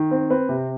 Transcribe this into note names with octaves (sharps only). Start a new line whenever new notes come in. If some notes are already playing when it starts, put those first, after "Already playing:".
Already playing: D#3
C4
C4 B4
C3